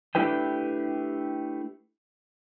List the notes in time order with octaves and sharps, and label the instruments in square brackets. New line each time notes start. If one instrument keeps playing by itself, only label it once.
[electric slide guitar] A3 D4 E4 G4 B4 G5